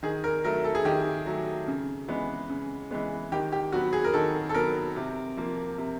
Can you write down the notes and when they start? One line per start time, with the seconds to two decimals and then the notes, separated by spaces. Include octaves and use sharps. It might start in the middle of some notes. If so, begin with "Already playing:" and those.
0.03 D#3 G#4
0.24 A#4
0.44 F#3 A3 A#4
0.64 A4
0.75 G#4
0.85 D#3 G4
1.26 F#3 A3
1.68 C#3
2.08 E3 G#3 B3
2.49 C#3
2.91 E3 G#3 B3
3.32 D#3 G4
3.52 G4
3.72 F#3 B3 F#4
3.93 G#4
4.05 A#4
4.13 D#3 A4
4.49 A4
4.54 F#3 B3 A#4
4.96 C3
5.37 F3 A#3
5.78 C3